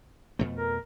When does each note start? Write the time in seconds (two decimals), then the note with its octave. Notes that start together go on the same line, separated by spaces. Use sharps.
0.39 F2 B2 A3
0.58 A#4